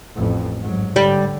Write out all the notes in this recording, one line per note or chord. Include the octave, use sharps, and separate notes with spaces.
A1 F2
G#2 F#3
D3 G3